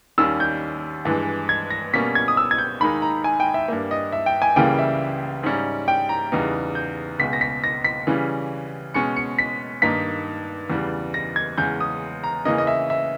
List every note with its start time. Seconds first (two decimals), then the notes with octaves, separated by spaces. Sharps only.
0.18 D#2 D#3 G3 C#4 E6
0.40 G6
1.05 G2 E3 G#3
1.49 G#6
1.70 A#6
1.93 B2 G3 A#3 C#4 B6
2.15 G#6
2.28 D#6
2.37 E6
2.51 G#6
2.58 G6
2.80 D#2 D#3 G#3 D#4 B5
3.02 A#5
3.24 G#5
3.40 G5
3.54 E5
3.68 G2 G3 A#3
3.91 D#5
4.12 E5
4.26 G5
4.42 G#5
4.56 C#2 C#3 E3 G3 A#3 G5
4.79 E5
5.43 G#2 G3 C#4
5.88 G5
6.09 A#5
6.32 E2 C#3 G3 B3 D#4
6.75 G6
7.19 C#2 B2 G#3 B6
7.33 A#6
7.41 B6
7.64 A#6
7.84 B6
8.07 C#3 E3 G3 C#4
8.94 B2 G#3 C#4 C#7
9.16 C#7
9.39 B6
9.82 G2 D#3 A#3 D#4 B6
10.70 E2 C#3 G3
11.14 A#6
11.36 G#6
11.57 E2 C#3 G#3 C#4 G6
11.80 D#6
12.24 A#5
12.45 C#3 E3 A#3 C#4 D#5
12.58 D#5
12.67 E5
12.90 E5